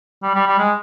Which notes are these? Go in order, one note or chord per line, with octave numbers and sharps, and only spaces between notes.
G3
G3
G3
G#3